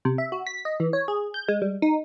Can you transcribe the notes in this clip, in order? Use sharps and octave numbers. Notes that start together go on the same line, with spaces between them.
C3
E5
F#4
B6
D#5
E3
C#5
G#4
G6
G#3
G3
D#4